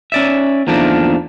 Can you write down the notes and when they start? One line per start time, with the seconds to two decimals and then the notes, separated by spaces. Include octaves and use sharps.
0.12 C#4 D5 E5
0.67 E2 D#3 F3 A3 A#3 D4